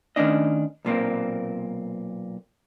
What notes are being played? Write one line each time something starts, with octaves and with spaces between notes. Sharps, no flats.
D#3 A3 C#4 D4 D#5
B1 A#2 A#3 C4